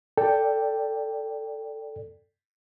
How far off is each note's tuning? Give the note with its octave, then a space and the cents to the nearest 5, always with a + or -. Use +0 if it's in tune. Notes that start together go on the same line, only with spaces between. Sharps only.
A4 +10 D5 +0 G5 +5